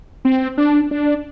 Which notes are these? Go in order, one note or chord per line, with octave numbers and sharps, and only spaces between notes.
C4
D4
D4